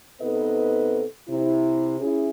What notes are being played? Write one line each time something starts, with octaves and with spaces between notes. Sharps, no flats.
C3 B3 D#4 A4 B4 D#5
C3 E4
C#4 E4 G#4